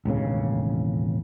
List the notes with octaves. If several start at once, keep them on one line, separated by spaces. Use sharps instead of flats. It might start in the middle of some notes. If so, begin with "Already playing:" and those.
E1 A1 D#2 C#3